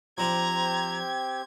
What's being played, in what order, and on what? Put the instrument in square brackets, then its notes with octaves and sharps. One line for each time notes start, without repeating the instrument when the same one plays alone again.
[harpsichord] F3 D4 F4 [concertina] C4 G4 [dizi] A#5 [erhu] G#6